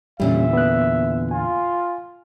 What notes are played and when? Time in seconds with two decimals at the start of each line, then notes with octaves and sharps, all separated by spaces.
0.20 E2 A#2 D3 G3 C#4 E5
0.53 B3 F#6
1.31 F4 G#5